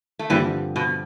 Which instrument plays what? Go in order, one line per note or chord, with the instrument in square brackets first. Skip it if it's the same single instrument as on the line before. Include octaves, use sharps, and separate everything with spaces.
[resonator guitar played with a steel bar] A3
[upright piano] G2 D3 F3 C4 G4 [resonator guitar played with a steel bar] E3 G3
[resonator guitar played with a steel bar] B2